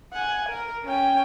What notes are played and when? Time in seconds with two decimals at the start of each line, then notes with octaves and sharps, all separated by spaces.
0.13 F#5 G#5
0.49 A#4
0.85 C#4 G5